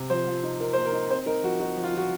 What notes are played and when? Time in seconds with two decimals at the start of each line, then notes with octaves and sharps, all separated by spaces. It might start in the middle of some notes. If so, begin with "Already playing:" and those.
Already playing: C3
0.10 F3 C5
0.27 F3
0.43 D#4
0.60 D#4 A#4
0.73 A#3 C5
0.85 A#4
0.93 D#4
1.10 C4 C5
1.26 D#4 A#4
1.43 F3 F#4
1.60 D#4 F#4
1.77 F3
1.84 F4
1.93 F3 F#4